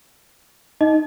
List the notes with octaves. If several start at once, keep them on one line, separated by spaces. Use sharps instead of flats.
D#4 D#5